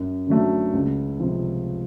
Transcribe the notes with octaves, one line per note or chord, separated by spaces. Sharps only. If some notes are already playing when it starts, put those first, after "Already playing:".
Already playing: F#2
D3 F#3 A3
C#2
C3 F3